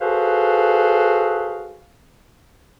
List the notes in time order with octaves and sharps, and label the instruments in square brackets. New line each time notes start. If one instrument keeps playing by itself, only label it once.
[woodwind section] F#4 G#4 A4 B4 C5 F5